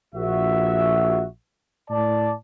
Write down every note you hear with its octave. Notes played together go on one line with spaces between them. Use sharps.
A#1 F#4 E5
A2 D5 A5